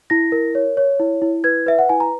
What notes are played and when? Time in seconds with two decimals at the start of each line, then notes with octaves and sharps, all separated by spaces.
0.10 E4 A#6
0.32 A#4
0.55 C#5
0.77 C#5
0.99 E4
1.22 E4
1.44 B4 G#6
1.66 B4 E5
1.79 F#5
1.89 E4 G#5
2.00 A#5